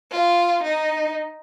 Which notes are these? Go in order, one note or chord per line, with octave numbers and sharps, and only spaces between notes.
F4
D#4